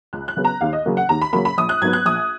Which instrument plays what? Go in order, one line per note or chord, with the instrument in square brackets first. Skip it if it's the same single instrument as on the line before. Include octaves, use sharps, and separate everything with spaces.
[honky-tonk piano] C#2 F#6
F#6
C#3 F#3 B3
A#5
D#2 F5
D#5
C#3 F#3 A#3
F#5
D#2 A#5
B5
C#3 F#3 A#3 B5
B5
A#1 D#6
F#6
G#2 F#3 B3 G#6
F#6
A#1 D#6